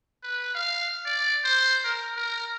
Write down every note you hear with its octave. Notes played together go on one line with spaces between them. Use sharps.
B4
F5
D5
C5
A#4
A#4